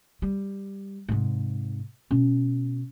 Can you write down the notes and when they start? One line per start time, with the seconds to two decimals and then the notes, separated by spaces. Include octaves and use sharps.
0.22 G3
1.08 G#2 C3
2.11 B2 C#4